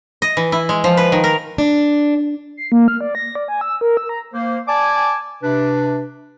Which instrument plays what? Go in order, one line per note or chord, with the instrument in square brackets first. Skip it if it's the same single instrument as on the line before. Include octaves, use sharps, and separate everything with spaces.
[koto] D#5
E3
E4
G#3
F3
B4
D#3
A#4
[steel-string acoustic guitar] D4
[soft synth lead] C7
A#3
F6
D5
A#6
D5
G#5
E6
A#4
E6
A#5
[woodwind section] A#3 C5
D5 G#5 A5 D6
C3 D4 B4